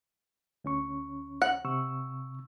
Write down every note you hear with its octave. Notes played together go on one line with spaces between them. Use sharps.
D2 C#4 C#6
F#5
C3 C#6 E6